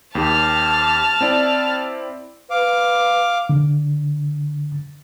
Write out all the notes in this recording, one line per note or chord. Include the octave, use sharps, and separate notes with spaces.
D#2 G4 A5 F6
C4 E4 D5
B4 F5 D6
D3